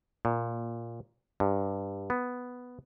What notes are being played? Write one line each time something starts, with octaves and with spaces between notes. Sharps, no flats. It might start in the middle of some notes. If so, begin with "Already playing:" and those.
A#2
G2
B3